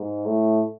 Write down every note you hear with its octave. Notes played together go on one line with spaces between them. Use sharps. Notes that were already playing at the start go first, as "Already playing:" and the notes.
Already playing: G#2
A2